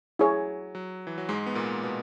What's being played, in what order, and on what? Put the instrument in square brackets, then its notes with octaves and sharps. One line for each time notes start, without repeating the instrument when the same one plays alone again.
[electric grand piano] F#3 [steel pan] E4 G#4 C#5
[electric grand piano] F#3
E3
F#3
G#2 G#3
B3
A#2 A#3
B2 B3